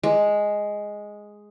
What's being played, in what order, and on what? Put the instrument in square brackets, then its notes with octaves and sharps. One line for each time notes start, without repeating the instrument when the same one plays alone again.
[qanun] G#3